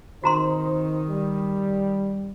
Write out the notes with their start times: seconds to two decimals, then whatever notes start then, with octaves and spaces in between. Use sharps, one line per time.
0.24 D#3 C4 D#4 F#4 C5 A#5 C6
1.09 G3